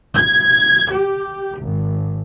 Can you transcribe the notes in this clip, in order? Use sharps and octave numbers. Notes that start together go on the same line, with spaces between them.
G#6
G4
G#1